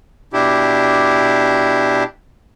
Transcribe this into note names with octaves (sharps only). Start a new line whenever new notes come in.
B2 D4 E4 G4